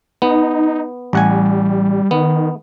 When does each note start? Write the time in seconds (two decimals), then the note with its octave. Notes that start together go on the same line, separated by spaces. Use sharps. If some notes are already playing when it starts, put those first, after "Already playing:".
0.22 B3 D#4
1.13 A1 G3 F#5 G#5
2.11 D#3 B3